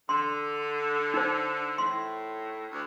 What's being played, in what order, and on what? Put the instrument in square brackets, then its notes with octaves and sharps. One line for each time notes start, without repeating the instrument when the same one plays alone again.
[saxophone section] D3 [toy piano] C6
[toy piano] D#4 C5
[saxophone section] A2 [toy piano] C6
[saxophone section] D2